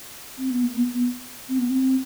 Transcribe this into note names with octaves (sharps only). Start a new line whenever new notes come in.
C4
B3
A#3
B3
B3
C4
B3
C4